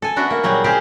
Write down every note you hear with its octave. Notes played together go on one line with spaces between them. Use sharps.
A4 G#5
B3 D4 F#4 E5
A#3
A#2 F#3 G3 G#4 F#5
G4 G#4 C5 D#5 F5 G#5